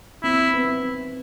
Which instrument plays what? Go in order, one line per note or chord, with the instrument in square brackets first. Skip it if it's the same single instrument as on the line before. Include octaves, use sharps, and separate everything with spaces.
[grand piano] C4 [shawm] E4
[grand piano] B3